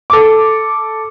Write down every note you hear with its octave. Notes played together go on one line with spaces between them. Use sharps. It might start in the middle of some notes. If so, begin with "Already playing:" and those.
A4 D6